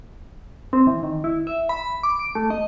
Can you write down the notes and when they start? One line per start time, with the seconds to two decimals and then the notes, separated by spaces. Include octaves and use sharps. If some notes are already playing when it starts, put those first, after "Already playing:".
0.73 C4
0.87 E3
1.03 D#3
1.24 E4
1.47 E5
1.69 B5
2.03 D6
2.19 D7
2.35 A3
2.50 D#5